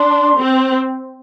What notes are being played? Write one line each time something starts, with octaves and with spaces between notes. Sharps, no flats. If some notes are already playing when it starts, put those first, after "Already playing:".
Already playing: D4 C6
C4